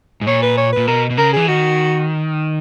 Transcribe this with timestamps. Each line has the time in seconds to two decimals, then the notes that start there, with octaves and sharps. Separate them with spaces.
0.21 G#2
0.27 A#2 C#5
0.42 B4
0.57 C#5
0.73 A#2 B4
0.87 B2 A#4
1.10 B2
1.17 C#3 A#4
1.33 E3 G#4
1.48 D#3 F#4